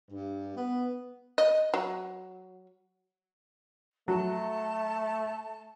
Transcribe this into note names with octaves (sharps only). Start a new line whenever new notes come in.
G2
B3
D#5
F#3
F#3 A3 A5